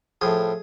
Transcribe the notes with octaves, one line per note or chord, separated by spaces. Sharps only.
A2 F3 G#4